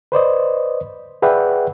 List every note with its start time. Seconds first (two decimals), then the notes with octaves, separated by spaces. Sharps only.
0.12 B4 C5 D5 D#5
1.22 G#4 B4 D5 E5 F#5 G5